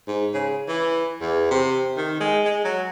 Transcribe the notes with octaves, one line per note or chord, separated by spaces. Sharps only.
G#2
C#3
E3
E2
C3
D#3
G#3
G#3
F#3